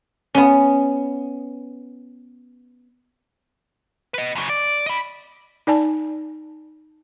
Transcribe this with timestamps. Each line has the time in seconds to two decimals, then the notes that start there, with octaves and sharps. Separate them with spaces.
0.35 B3 C#4
4.14 B4 D#5
4.35 F#2 C#3
4.49 D5
4.86 D#5 B5
5.67 D#4 D5 G#5 A5